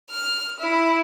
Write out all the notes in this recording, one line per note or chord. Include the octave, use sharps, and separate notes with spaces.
F6
E4